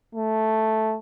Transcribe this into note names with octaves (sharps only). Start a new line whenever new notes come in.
A3